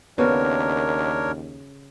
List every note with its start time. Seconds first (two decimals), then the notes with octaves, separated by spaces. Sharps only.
0.18 D#2 C#3 B3 D4 F#4 A#4 C#5